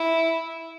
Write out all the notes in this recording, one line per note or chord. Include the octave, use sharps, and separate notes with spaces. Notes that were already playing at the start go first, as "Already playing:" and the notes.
Already playing: E4